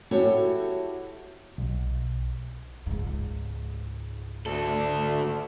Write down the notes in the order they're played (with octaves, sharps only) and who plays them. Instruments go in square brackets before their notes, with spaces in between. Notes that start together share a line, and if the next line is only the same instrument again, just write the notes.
[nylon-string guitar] E4 F#4 G4 A4 C#5
[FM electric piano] B1
[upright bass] C#2 G#2
[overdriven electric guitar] D2 A4